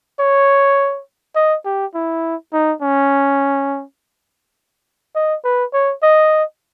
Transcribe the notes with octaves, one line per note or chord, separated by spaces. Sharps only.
C#5
D#5
G4
E4
D#4
C#4
D#5
B4
C#5
D#5